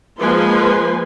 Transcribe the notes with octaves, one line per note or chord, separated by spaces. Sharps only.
F3 G#3 A#3 B4 G#5 C6